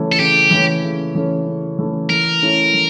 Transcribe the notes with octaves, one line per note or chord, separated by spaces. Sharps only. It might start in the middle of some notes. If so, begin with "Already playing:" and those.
Already playing: C#3 E3 A3 C#4
A4
C#3 G4
E3 A3 C#4
C#3
E3 A3 C#4
C#3
E3 A3 C#4
E3 A#4
A3 C#4 E4
E3